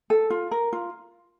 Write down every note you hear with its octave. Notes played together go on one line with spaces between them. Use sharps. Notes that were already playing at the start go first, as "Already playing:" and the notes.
A4
F4
A#4
F4